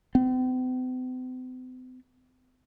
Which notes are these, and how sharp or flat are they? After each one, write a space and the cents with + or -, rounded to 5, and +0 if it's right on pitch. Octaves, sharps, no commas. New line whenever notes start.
C4 -45